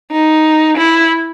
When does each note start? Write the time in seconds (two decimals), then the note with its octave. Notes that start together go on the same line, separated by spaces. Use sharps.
0.12 D#4
0.78 E4